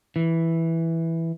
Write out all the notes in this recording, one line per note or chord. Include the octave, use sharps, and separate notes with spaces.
E3